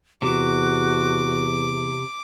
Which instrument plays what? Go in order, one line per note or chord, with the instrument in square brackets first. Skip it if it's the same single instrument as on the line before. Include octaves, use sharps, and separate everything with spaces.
[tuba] E2 [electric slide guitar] C3 [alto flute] F#4 [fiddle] D6